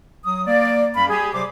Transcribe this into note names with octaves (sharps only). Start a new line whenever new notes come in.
F#3 D#6
A#3 D5
F#2 G3 F5 B5
G4 G#4
C3 F#3 G3 C5 D6